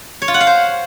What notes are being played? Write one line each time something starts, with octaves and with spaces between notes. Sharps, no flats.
C#5
F4
F#5
F5
C5